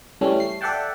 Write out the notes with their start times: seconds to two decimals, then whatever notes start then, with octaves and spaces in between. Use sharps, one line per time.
0.21 C#3 E3 G3 A3 C#4
0.40 C7
0.61 A4 D5 E5 F#5 G5 A5